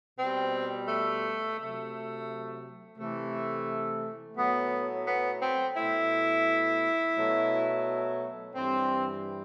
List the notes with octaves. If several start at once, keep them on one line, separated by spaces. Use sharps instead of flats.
B2 G3 C4
A3
C3 F#3 A3
C3 E3 A3
A2 F#3 A3 B3
B3
C4
B2 A3 E4
B2 F#3 A3
G2 E3 G3 C4